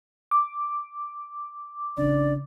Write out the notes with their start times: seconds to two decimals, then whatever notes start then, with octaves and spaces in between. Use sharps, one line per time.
0.31 D6
1.97 A1 C#3 D4 D5